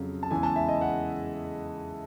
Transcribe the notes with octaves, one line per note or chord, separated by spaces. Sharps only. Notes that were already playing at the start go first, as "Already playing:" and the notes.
Already playing: F2 C#3 F#3
A5
E2 C#3 E3 G#3 G#5
A5
E5
D#5
F#5